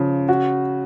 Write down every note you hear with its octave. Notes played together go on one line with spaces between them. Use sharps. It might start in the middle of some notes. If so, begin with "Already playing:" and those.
Already playing: C#3 F3
F#4